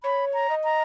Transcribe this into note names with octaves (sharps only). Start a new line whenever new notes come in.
C#5 B5
A#5
D#5
A#5